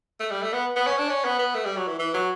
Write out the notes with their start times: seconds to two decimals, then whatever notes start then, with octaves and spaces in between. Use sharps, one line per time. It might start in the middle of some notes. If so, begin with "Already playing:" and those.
0.20 A3
0.31 G3
0.42 A3
0.53 B3
0.76 B3
0.87 C#4
0.98 D4
1.09 C#4
1.25 B3
1.39 B3
1.55 A3
1.65 G3
1.77 F#3
1.88 E3
1.99 E3
2.14 F#3